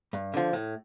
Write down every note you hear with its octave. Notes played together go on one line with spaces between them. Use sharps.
G2
D3 F3
A2